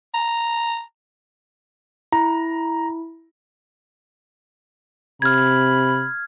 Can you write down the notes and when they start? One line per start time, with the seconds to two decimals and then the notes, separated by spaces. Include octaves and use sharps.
0.14 A#5
2.12 E4 A#5
5.22 C3 B5 F6 G#6